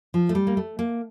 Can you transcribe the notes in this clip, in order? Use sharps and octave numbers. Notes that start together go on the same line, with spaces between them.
F3
A3
G3
A#3
A3
A#3